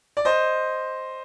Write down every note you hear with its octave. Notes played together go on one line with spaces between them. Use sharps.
D5
C5 D#5